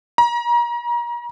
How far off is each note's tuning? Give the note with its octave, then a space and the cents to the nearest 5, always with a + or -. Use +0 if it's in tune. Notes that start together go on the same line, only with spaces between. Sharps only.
A#5 +35